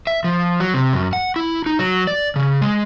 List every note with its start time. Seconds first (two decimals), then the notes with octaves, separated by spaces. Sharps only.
0.07 E5
0.24 F3
0.60 F#3
0.74 C3
0.93 F#2
1.13 F#5
1.36 E4
1.66 D#4
1.79 F#3
2.07 D5
2.36 C#3
2.61 G#3